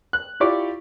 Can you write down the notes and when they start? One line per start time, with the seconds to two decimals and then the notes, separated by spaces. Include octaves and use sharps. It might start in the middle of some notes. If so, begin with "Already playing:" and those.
0.13 F#6
0.40 E4 F4 G4 D5 C#6 D6